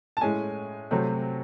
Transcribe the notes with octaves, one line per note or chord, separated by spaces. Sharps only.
A5
A2 G#3 C#4 G#5
C3 F#3 A3 C4